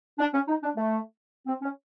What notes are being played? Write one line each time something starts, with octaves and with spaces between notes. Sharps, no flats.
D4
C#4
D#4
D4
A3
C4
C#4